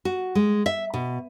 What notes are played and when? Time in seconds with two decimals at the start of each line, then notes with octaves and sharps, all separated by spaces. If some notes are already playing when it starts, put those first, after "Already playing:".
0.05 F#4
0.35 G#3
0.66 E5
0.94 B2